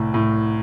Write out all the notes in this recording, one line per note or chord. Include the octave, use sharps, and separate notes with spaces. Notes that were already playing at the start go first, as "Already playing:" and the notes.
Already playing: C2 A2
A2